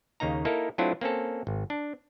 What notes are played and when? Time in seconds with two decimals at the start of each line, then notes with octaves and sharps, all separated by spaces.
0.20 D#2 C#3 A#3 D#4 A#5
0.45 A#3 D#4 E4 A4 A#4
0.78 F#3 A3 C4 D4 E4 F4
1.01 A#3 C4 C#4 A4
1.47 G#1
1.70 D4